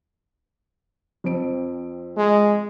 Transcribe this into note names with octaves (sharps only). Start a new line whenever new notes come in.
F2 C4 D7
G#3